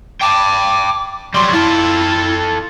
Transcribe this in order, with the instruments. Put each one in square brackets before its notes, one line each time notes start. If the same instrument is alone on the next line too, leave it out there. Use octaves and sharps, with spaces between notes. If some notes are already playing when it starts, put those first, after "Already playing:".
[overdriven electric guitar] G5 A5 [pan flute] D6
[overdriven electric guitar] F#3 G3 [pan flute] C6
[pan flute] E4 [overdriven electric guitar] F4 A4